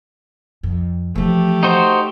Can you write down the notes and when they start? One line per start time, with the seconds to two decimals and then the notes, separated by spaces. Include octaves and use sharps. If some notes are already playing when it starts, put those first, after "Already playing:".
0.63 F2
1.15 E3 F3 A3 G4
1.63 D#4 F#4 C5